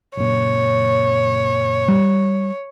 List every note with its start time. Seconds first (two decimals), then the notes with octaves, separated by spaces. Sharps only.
0.17 F#1 A#2 C#5
1.88 G3